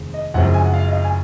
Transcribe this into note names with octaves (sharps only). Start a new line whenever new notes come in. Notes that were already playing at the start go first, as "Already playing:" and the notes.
Already playing: F1 D#2 D#3 G#3
D#5
F#1 F#2 F3 G#3 C4 F#5
G#5
F#5
F5
D#5
F5
G#5